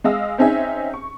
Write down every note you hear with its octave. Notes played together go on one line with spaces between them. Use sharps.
G#3 D#5 F5 E6
C4 C#4 D#4 G#4 E5
C#6